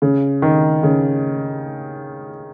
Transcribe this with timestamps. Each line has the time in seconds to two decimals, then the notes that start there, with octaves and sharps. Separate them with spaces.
0.02 C#3
0.42 D#3
0.83 C#3